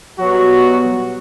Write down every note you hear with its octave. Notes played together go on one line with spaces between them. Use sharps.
B2 F#3 G3 B3 F#4